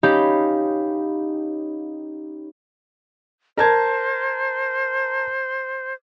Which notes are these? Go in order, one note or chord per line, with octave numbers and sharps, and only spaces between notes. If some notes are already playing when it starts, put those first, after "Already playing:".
C#4 D#4 G4 F5 B5 G6
A#4 C5 A5 G#6